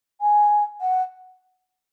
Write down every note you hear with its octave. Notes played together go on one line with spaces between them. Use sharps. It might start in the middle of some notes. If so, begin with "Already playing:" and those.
G#5
F#5